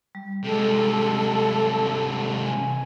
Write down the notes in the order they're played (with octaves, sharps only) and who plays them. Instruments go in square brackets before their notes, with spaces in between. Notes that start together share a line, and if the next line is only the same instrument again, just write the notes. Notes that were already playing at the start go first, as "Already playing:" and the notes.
[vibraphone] G3
[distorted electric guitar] C3 G#3 [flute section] A4
[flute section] G#5